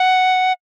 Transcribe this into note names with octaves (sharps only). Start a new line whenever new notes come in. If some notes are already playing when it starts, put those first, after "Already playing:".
Already playing: F#5